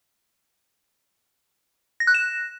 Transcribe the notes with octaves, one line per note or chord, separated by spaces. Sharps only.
A#6
F#6
E7